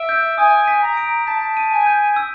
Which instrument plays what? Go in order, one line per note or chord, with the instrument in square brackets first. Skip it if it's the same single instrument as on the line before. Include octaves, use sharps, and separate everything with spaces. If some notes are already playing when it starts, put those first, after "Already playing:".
Already playing: [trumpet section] E5 [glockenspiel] D7
[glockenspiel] G6
[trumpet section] G#5 [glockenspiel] D#6
[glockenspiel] B6
[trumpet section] A#5
[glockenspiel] D7
[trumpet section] A5 [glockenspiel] B6
[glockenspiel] D#7
[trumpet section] G#5
[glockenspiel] G6
E6